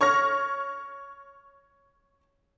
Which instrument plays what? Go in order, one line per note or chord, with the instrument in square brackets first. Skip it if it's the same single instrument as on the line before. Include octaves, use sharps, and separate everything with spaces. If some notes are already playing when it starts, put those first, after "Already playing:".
[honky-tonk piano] C#5 C#6 F6 A#6